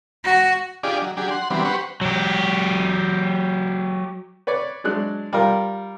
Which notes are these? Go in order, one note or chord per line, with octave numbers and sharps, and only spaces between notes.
F#4
D4 F4 G4 G#4 D5 D#5
F#3
F#3 D4 G4 G#4
F#5 C6
E3 F#3 G3 B3 C4 D4
G4 B4 C5 F#5 C#6
F#3 G4
B4 C#5 D5
F#3 G#3 D4 F#6
G3 F4 A#4